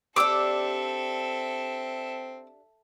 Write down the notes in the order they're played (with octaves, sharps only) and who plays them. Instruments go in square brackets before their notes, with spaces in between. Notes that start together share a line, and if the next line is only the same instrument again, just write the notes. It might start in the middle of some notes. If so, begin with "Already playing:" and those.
[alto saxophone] C4 [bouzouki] D4 G4 [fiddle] A4 E5 [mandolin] D6 E6